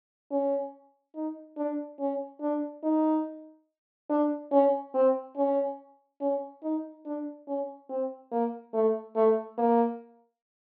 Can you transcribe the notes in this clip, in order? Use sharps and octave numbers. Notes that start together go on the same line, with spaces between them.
C#4
D#4
D4
C#4
D4
D#4
D4
C#4
C4
C#4
C#4
D#4
D4
C#4
C4
A#3
A3
A3
A#3